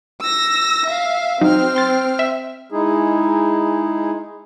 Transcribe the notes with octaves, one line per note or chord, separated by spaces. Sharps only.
E6 A#6
E5 F5
F#3 C4 D#4 F6
C6 A6
E5
G#3 D#4 E4 G#4